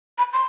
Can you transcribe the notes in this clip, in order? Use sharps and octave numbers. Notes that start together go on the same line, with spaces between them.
B5
C6